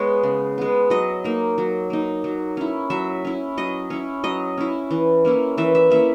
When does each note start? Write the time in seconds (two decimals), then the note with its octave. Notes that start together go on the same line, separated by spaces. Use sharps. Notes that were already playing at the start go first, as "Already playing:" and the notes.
Already playing: G#3 B3 C#5
0.23 C#3
0.58 G#3 B3
0.90 F#3 D#5
1.24 A#3 D#4
1.58 F#3
1.90 A#3 D#4
2.24 F#3
2.57 C#4 E4
2.90 F#3 E5
3.25 C#4 E4
3.57 F#3 D#5
3.90 C#4 E4
4.24 F#3 D#5
4.58 C#4 E4
4.91 E3
5.25 A#3 C#4 E4
5.58 E3 E5
5.75 E5
5.90 A#3 C#4 E4 E5